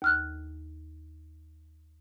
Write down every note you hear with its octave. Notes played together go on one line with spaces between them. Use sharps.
D#2 F6 F#6